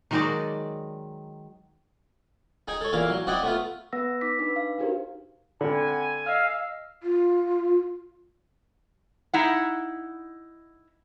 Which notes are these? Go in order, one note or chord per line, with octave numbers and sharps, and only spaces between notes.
D#3 F#3 G#3 D#4 F#4 D5
D#4 G#4 G5 G#5
A4 C#5
E2 A#2 E4 A#4 F5
F#3
C4 D#4 E4 D5 D#5 F#5
A3 B3 F4
B3 B4 F#5 E6 A#6
D#4 D6 B6
D4 D#4 B4
F5
D4 D#4 F#4 G4 A#4 C5
D3 C4 F#5 G#5 B5
D#5 F5 E6 F6
F4
D#4 E4 F#5